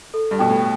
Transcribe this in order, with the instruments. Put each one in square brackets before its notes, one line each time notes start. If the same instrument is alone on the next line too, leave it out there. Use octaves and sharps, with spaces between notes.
[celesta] A4
[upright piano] G2
[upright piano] B2 [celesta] G5
[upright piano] A2